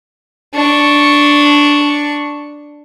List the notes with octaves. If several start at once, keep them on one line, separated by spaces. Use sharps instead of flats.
D4 C#6